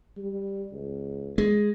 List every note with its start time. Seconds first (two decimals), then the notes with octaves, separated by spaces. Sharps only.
0.17 G3
0.72 C#2
1.38 G#3